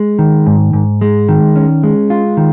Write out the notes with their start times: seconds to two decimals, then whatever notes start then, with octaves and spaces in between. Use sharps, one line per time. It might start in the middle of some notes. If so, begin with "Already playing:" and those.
Already playing: G#3
0.19 D#3
0.47 G#2
0.73 G#2
1.01 G#3
1.29 D#3
1.56 C#4
1.83 G#3
2.10 F4
2.37 D#3